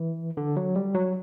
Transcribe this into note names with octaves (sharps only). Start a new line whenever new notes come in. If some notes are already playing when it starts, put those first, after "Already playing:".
Already playing: E3
D3
F#3
G3
F#3